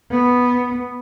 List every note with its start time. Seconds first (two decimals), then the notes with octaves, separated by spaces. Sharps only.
0.11 B3